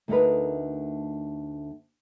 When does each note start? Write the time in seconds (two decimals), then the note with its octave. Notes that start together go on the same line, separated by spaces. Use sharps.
0.08 D2 A3 D4 D#4 A#4 B4